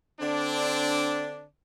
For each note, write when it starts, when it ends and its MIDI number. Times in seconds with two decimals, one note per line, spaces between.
0.20 1.44 50
0.20 1.44 60
0.20 1.44 62